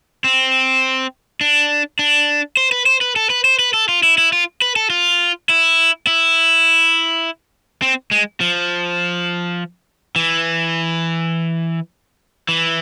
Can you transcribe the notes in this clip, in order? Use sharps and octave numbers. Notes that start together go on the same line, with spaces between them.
C4
D4
D4
C5
B4
C5
B4
A4
B4
C5
B4
A4
F4
E4
E4
F4
B4
A4
F4
E4
E4
C4
G#3
F3
E3
E3